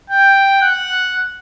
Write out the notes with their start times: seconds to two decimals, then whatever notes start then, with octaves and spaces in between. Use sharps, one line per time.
0.10 G5
0.62 F#5